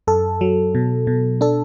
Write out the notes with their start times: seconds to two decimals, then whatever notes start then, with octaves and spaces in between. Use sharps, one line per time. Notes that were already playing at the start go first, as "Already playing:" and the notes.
0.07 F#2 A4
0.41 F#3
0.75 B2
1.07 B2
1.41 D4 A4